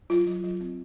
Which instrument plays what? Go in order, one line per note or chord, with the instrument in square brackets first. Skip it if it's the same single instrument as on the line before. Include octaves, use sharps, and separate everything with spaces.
[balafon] F#3 F4
F#3
F#3
C4